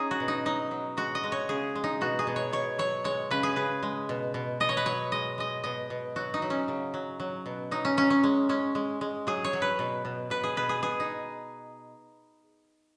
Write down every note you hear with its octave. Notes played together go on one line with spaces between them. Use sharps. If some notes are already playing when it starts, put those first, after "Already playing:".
Already playing: C#4 D#4 G#4
F#4
B2
D#4
F#3 D#4
F#3
G#3 F#4
D#5
G#3
C#5
C#3 G#4
G#3
D#4
B2 F#4
G#4
B2
C#5
B2 C#5
F#3 C#5
G#3 C#5
C#3 B4
G#4
C#3 B4
G#3
B2
B2
B2 D#5
C#5
B4
F#3 C#5
G#3 D#5
G#3 D#5
B2 D#5
B2
F#3 F#4
D#4
F#3
C#4
C#3
F#3
F#3
B2
F#3 D#4
C#4
F#3 C#4
C#4
G#3
G#3 C#4
G#3
G#3
F#3 G#4
C#5
F#3
B4
B2
B2
B2 B4
G#4
B2 B4
G#4
B2 G#4
D#4